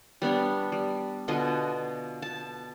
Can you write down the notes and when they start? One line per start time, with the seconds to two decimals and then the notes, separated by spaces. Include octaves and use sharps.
0.22 G3 B3 D4 C#5
0.72 G3
1.28 B2 D3 F4 D#5
2.22 A5